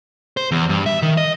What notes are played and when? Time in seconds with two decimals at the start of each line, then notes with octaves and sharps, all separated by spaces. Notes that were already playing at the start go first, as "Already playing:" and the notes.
0.37 C5
0.51 E2
0.69 G2
0.86 E5
1.02 D#3
1.17 D#5